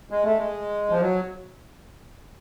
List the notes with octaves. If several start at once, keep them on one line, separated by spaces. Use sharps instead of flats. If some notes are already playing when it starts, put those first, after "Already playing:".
G#3
A3
G#3
F3
F#3